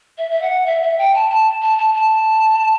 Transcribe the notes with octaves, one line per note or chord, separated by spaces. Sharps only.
E5
E5
F#5
E5
E5
G5
A5
A5
A5
A5
A5